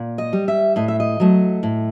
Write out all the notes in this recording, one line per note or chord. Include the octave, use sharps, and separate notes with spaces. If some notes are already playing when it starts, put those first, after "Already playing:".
Already playing: A#2
D#5
G3
E5
A2 D#5
E5
D#5
F#3 A3
A2